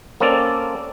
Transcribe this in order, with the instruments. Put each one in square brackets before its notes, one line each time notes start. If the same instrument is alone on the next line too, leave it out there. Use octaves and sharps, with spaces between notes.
[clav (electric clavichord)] A#3 C4 C#4 A4 D5